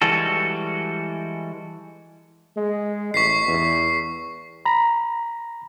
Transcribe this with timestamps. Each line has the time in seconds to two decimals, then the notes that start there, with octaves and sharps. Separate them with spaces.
0.02 E3 G3 G#3 F#4 A4
2.56 G#3
3.14 A1 C#6 B6 C7
3.48 E2
4.65 A#5 B5